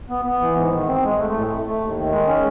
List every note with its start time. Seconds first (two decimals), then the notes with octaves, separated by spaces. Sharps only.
0.09 B3
0.25 B3
0.41 E3
0.56 G#2
0.71 D#3
0.87 C4
1.03 G#3
1.19 A3
1.34 A2
1.50 A3
1.65 A3
1.80 D#2
1.96 D#3
2.12 G#3
2.28 C#4